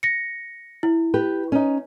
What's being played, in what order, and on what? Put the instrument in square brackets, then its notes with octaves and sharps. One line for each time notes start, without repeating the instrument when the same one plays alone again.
[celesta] A#6 C#7
E4
[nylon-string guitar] G4 B4
C#4 D#4